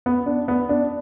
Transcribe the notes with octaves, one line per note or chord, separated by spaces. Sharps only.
B3
D4
B3
D4